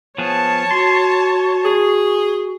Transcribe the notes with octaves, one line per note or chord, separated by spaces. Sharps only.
F3 B3 G#4 C#5 A5
F#4 C6
G#4